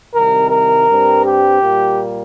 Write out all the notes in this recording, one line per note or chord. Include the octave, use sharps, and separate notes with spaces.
C2 C3 D#3 G3 A#4
A#4
G2 G3 C4
G4
A#2 G3 A#3